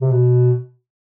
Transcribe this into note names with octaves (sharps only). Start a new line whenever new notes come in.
C3
B2